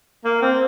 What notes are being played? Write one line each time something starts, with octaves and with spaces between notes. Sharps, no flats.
A#3
C4